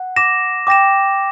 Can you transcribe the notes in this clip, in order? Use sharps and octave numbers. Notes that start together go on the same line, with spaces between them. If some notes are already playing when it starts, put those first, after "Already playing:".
Already playing: F#5
D6 A#6 E7
G5 D6 A#6 E7